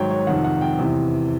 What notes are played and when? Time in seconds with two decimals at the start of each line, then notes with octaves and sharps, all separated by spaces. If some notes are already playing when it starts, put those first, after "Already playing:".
Already playing: G#2 D#3 F#3 C#5 G5
0.11 C#5
0.27 F2 C3 D#3 F#5
0.44 F#5
0.61 G5
0.79 E2 C3 E3